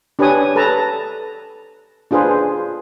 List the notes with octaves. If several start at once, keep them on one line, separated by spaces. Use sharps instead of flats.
D4 G4 B4 C#5 G#5 D#6
A4 B4 A5 A#5
D4 F4 G#4 B4 C5